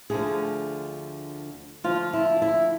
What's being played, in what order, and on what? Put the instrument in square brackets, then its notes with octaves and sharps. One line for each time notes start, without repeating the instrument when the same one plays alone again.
[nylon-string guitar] D2 D3 F3 G#4
D2 D3 F3 F4
E4
D4
E4